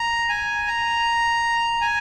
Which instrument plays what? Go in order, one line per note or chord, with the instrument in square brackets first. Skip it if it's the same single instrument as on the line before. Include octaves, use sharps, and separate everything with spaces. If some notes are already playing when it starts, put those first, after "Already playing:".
Already playing: [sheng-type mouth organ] A#5
G#5
A#5
G#5